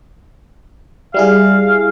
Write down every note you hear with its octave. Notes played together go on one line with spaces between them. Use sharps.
G3 E4 G#4 F5